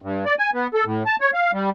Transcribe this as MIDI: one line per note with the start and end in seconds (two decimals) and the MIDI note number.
0.02 0.25 43
0.26 0.35 74
0.39 0.50 80
0.54 0.67 59
0.74 0.84 69
0.85 1.03 45
1.06 1.16 81
1.21 1.31 73
1.34 1.51 77
1.53 1.70 55